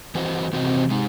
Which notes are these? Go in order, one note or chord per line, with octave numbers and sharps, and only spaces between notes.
E3 C4 F#4 C5 D#5
C3 E3 C4 F#4 C5 D#5
G#3 D#4